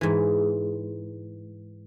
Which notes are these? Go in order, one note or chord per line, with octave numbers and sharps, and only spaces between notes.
G#2 E3